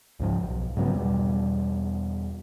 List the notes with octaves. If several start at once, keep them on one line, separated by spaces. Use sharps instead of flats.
C#2 G#2 F3
B1
G#2 C#3 F#3 B3
E2 B2 G3